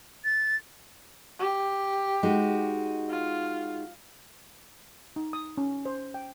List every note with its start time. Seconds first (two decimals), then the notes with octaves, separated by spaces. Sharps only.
0.25 A6
1.39 G4
2.23 G#3 D#4 F#4
3.10 F4
5.16 D#4
5.33 D#6
5.58 C#4
5.85 C5
6.14 G5